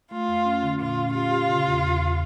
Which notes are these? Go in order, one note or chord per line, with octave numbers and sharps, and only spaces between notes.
A3 F4
F2
C#4
D3
A#2 F4
C#4
F4 G4
G4
C#3
E2
E2
E2